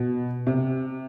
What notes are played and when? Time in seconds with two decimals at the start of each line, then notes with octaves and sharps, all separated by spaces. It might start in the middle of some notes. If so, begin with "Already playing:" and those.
Already playing: B2
0.47 C3